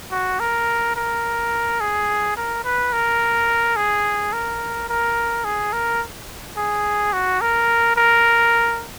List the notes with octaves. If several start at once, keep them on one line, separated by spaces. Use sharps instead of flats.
F#4
A#4
A#4
G#4
A#4
B4
A#4
G#4
A#4
A#4
G#4
A#4
G#4
F#4
A#4
A#4